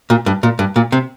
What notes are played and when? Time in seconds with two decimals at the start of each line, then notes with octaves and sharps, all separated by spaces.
0.10 A#2
0.26 G2
0.43 A#2
0.59 G2
0.76 A#2
0.92 C3